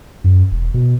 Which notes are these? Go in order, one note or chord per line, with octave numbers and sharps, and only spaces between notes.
F#2
E1
B2